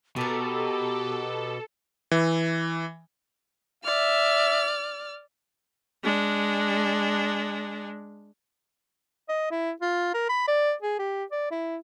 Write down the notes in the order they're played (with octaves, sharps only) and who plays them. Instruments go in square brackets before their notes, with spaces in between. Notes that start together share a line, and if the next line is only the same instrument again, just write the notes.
[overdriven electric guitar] B2 [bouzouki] G4 A#4 [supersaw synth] A4 [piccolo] D6
[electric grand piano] E3
[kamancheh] D5 F6 [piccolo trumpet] E5
[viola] G#3 D4
[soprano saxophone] D#5
E4
F4
A#4
B5
D5
G#4
G4
D5
E4